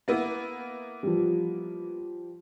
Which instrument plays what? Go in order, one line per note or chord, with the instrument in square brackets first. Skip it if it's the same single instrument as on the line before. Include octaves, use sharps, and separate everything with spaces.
[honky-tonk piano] A#3 B3 E4
[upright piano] F3 G3